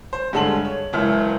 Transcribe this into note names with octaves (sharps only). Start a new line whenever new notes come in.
C5
G2 D3 G#3 A5 F#7
C#5
F#1 C#2 E3 E5 F6